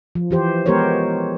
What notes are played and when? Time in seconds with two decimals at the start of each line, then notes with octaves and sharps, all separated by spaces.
0.15 F3
0.31 E3 G4 C5
0.66 G#3 B3 G4 A#4 C5 C#5